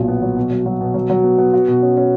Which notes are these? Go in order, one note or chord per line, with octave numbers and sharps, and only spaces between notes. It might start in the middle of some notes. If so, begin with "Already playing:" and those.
Already playing: B1 A#2
B3
F#3
B2
F#3
F#3
B2
F#3
F#3
B3
B3
F#4
B2
C#4
C#4